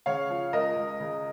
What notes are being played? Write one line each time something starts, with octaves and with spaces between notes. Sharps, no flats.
C#3 C#5 F5
F3
C#2 A#4 D#5
C#2
C#3